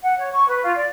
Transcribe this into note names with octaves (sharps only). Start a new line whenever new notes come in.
F#5
C#5
C#6
B4
F4
D5